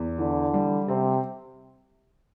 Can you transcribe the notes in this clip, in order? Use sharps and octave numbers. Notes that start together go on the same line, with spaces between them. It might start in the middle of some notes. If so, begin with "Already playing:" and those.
Already playing: E2
D3 E3
G3
C3 C4